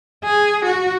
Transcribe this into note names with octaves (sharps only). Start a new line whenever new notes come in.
G#4
F#4